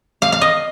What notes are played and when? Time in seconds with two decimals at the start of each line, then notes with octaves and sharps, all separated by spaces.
0.22 F5
0.32 F5
0.41 D#5